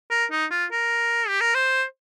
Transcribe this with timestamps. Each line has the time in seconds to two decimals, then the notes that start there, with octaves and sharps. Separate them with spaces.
0.11 A#4
0.31 D#4
0.51 F4
0.72 A#4
1.28 G4
1.41 A#4
1.55 C5